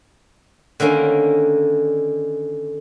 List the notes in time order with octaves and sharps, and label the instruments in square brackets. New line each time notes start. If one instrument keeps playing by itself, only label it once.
[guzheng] D3 D#3 A#3 C#4